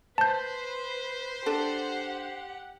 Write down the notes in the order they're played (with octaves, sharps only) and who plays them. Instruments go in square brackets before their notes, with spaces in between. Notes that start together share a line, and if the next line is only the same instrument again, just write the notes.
[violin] B4 [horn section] C5 [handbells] A5 G6
[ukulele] D4 A4 [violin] G4 F#5